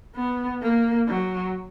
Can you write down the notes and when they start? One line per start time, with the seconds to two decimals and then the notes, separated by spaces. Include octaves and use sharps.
0.16 B3
0.62 A#3
1.08 F#3